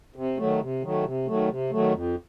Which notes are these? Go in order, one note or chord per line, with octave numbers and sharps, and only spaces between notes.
C3
D#3 F#3 A3
C3
D#3 F#3 A3
C3
D#3 F#3 A3
C3
D#3 F#3 A3
F2